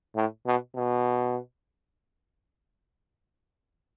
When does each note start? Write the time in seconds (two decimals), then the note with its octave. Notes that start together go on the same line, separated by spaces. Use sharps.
0.16 A2
0.46 B2
0.76 B2